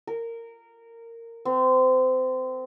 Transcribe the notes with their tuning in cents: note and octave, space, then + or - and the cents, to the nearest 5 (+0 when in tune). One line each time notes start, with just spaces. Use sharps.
A#4 -15
C4 -25